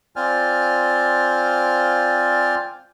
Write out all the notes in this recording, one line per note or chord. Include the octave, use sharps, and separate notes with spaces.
C4 F4 C5 D5 G#5 F6